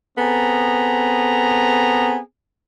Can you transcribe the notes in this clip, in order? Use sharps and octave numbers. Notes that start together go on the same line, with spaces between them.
B3 C4 G#4 A4 A#5